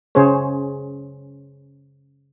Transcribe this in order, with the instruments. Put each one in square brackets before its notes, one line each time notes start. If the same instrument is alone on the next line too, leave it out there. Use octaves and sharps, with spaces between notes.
[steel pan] C#3 C#4 G#4 C5 C#5